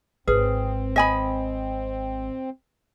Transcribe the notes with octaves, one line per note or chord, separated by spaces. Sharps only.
G#1 C4 G#4 B4
D#5 G#5 B5